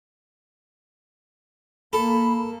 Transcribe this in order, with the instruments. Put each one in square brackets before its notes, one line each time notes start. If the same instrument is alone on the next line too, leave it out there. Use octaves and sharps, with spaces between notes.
[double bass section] A#3 [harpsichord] A4 [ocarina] B5